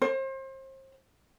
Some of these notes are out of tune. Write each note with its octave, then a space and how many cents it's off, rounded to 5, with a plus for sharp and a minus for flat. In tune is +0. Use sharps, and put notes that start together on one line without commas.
C5 +35